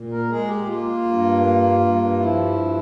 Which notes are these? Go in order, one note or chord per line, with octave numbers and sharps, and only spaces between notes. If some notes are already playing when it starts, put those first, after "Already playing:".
Already playing: A#2
A#4
G#3 G#4
G4
A#3 F4
G2
A#3
G2
F3 E4
G2